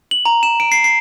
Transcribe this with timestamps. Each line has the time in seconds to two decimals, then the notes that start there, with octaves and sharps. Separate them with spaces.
0.11 F#7
0.26 A#5
0.43 E7
0.60 D7
0.72 C7
0.84 C7